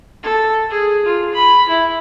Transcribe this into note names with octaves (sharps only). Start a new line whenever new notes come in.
A4
G#4
F4
B5
E4